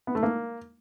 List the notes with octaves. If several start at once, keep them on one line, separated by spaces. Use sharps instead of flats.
B3
A3
A#3